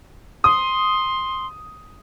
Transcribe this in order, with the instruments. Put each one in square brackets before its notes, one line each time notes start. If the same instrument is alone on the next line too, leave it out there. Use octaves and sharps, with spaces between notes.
[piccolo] C6 [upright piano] D#6